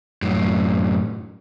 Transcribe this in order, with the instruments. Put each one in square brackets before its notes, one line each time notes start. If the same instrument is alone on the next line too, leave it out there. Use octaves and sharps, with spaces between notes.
[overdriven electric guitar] F#2 A2